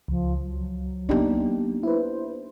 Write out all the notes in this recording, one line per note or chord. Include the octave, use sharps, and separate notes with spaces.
C#2 F3
F#3
A#3 B3 D4 D#4 G4
E4 B4 C5